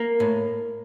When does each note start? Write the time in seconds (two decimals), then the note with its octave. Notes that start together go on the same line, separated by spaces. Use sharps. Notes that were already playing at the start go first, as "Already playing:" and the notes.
Already playing: A#3
0.20 A2